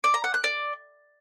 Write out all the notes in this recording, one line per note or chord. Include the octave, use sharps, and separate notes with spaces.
D5
A#5
F#5
F#6
D5